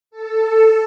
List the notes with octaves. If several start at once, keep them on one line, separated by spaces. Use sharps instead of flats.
A4